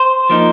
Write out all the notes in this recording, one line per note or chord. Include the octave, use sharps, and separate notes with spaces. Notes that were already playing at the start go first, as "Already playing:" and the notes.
Already playing: C5
F3 A#3 D#4